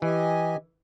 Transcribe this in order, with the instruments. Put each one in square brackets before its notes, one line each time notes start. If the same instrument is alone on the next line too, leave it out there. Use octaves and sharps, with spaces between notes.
[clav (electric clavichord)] E3 [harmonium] G4 D#5 G#5